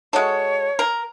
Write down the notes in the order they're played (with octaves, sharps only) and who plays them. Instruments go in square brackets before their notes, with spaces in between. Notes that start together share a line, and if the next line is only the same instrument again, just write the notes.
[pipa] G#3 F#4 A4 [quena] C#5
[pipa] A#4